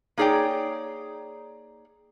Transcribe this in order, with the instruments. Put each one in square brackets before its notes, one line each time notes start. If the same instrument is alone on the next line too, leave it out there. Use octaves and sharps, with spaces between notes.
[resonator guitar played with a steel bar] A#3 D#4 G#4 C#5 D5 G5